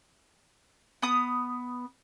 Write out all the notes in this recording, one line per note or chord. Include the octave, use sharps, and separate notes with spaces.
B3 D#6